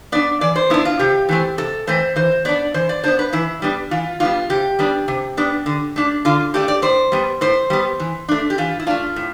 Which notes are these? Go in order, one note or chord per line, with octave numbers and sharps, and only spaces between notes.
B3 D4 D5
E3 D5
C5
B3 D4 E4
F4
C3 G4
E3 A3 C4
C3 A4
E3 A3 C4 C5
E3 C5
B3 D4 D5
E3 C5
D5
B3 D4 C5
B4
E3 E4
G3 B3 D4
E3 F4
G3 B3 D4 F4
C3 G4
G3 B3 D4
C3
G3 B3 D4
D3
A3 D4
D3 F4
A3 D4 G4
D5
A2 C5
G3 B3
A2 C5
G3 B3
E3
A3 D4
G4
E3 F4
E4
A3 D4 F4
A2